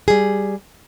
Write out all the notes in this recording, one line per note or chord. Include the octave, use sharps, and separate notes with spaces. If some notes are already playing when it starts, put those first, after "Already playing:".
G3 G#4